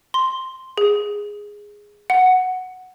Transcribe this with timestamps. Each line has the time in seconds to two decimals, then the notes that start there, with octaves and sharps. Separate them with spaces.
0.14 C6
0.78 G#4
2.10 F#5